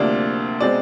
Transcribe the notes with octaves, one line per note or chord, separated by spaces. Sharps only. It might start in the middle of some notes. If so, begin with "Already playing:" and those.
Already playing: D2 C3 F3 A#3 D4 D5
B2 G#3 C4 D5